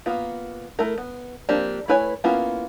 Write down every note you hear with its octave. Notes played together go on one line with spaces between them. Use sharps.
A#3 B3 F4
A3 E4 A#4
B3
F3 A#3 C4 D4 G4
A3 E4 B4 C#5 G#5
A#3 B3 C#4 E4 F4